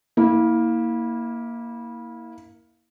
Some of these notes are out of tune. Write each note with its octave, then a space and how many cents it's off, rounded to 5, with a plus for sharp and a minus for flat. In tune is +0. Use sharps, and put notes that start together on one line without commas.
A#3 +5 E4 -25